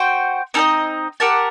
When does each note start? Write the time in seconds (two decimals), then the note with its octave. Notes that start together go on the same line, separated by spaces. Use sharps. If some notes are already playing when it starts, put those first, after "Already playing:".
Already playing: F#4 C5 G5
0.54 C4 D#4 A4 D#5
1.20 G4 A#4 F#5 A5